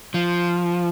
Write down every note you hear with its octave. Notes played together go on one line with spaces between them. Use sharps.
F3